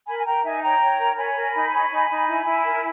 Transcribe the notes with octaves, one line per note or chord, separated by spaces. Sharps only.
A#4 G#5 B5
G#5
A#4 G5 A#5
D#4 E5 G#5
C#5 G5 A#5
C#5
A#4
C#5 G#5 B5
A#4
D#4
C#5
D#4
D#4
E4
E4
A#4